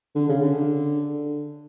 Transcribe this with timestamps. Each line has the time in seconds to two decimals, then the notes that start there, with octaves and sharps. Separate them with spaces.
0.15 D3
0.29 C#3
0.42 D3